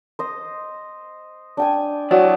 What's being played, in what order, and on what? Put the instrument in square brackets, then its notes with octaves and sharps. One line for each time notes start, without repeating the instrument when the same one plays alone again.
[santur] C5 D#5
D4 G5 G#5
[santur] F#3 [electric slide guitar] E4 D5